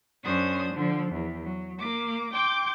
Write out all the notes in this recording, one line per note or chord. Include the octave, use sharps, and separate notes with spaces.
F#2 C#4 D4 C5 D#6
D3 F3
E2
F#3
A#3 D6
G5 C6 D6 G6